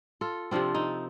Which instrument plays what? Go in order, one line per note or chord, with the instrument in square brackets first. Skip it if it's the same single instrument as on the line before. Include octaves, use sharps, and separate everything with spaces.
[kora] F4 A4
C3 F3 C4 D4 F4
C4 D#4